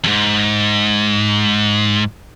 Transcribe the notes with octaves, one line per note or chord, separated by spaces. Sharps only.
F2 G#2